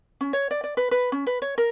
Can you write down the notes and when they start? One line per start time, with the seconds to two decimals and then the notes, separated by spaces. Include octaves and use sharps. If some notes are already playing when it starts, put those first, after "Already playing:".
0.21 C#4
0.33 C#5
0.51 D5
0.64 D5
0.77 B4
0.91 B4
1.12 C#4
1.27 B4
1.42 C#5
1.58 A#4